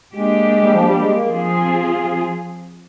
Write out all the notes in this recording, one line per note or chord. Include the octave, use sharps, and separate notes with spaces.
G#3 A#3 D4 G4
G3
F3
G3
G#3
A#3
F3 C4 F4 G#4